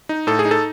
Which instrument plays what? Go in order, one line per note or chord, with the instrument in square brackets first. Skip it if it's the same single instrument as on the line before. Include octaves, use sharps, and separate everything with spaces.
[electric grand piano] D#4
A2 A4
G#4
D#4
A4